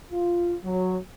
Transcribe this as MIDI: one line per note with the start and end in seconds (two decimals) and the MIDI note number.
0.12 0.55 65
0.64 0.96 54